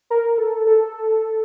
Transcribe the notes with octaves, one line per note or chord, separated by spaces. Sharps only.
A#4
A4
A4